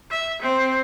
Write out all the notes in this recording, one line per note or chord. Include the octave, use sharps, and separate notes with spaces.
E5
C4